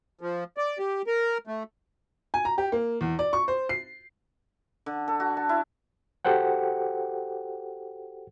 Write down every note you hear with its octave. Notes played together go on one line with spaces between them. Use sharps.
F3
D5
G4
A#4
A3
G#5
A#5
G4
A#3
E2
D5
C#6
C5
C7
D3
A4
F#4
A5
E4
F#4 G4 A4 C5 F#5 G5